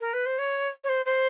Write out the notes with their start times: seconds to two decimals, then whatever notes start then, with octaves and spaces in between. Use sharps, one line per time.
0.01 A#4
0.13 B4
0.26 C5
0.39 C#5
0.84 C#5
0.89 C5
1.05 C5